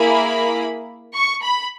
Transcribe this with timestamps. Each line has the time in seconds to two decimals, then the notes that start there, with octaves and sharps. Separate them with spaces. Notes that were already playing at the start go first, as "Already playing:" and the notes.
Already playing: A#3 E4 G#4 B5
1.14 C#6
1.42 B5